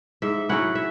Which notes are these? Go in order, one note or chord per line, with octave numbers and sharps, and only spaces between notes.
G#2 E5
F#3 C#4 E4 F#5
E5